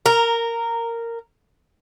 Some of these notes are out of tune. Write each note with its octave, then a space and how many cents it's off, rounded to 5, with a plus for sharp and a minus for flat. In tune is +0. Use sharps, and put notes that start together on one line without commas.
A#4 -10 A#5 +5